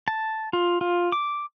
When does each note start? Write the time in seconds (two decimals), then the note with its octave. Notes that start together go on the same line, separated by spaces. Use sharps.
0.08 A5
0.53 F4
0.81 F4
1.12 D6